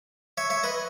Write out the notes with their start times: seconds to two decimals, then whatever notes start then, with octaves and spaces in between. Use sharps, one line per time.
0.37 C#5 E5
0.50 C#5 E5
0.63 B4 D#5